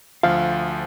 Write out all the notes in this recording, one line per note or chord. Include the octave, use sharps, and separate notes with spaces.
D2 F3 F5